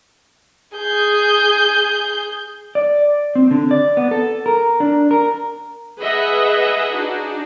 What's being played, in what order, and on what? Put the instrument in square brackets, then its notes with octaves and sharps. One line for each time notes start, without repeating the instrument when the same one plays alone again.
[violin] G#4 G6
[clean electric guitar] D5
C4
D3
D5
B3
A4
A#4
D4
A#4
[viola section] G#4 B4 D#5 E5 F#5
D4 D#4 F#4 G#4